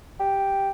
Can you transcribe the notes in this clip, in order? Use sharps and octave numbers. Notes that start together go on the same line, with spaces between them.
G4